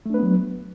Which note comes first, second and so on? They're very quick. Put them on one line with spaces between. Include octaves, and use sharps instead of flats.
A3 D4 B4 B3 F#3